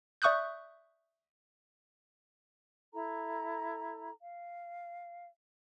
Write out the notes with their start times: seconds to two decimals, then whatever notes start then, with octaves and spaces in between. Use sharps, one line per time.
0.22 D5 E5 C#6 D#6 F#6 G6
2.93 E4 A4 A#5
4.22 F5